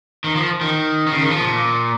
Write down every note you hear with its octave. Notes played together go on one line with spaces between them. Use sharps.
D#3
F3
D#3
D#3
C#3
D#3
F3
A#2